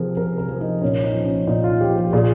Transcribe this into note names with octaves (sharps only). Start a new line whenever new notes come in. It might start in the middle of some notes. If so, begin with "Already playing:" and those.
Already playing: C3 F3 G#4 A#4
C3 A#4
A#4
F3
D#4
A#2 C#4
D#4
F3
C#4
A#2 D#4
F4
F3 G4
G4
A#2 G#4